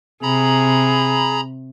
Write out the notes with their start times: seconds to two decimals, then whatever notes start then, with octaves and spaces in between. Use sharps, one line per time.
0.22 C3 G#4 A#5 B5